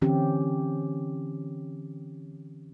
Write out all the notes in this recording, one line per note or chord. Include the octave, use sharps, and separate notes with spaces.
D3 E3 C4 C#4 G4